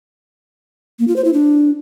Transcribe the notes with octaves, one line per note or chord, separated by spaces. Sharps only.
A#3
F4
C5
E4
D4